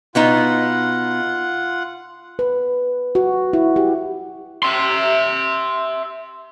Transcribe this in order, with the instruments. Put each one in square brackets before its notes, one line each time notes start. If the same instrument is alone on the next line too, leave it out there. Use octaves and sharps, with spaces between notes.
[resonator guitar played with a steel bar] B2 B3 D#4 [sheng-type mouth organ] F4 F#5
[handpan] B4
F#4
E4
G4
[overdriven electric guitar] E5 C6